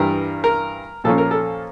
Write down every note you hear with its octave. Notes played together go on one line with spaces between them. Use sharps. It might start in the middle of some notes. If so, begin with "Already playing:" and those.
Already playing: G2 E3 G3 A#4
A#4
A#2 F3 A#3 C#4 A4
A#4
A4